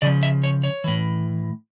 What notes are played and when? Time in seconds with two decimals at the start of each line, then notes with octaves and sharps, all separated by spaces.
0.02 C#3 F3 D5
0.23 E5
0.44 C#5
0.63 C#5
0.84 A2 E3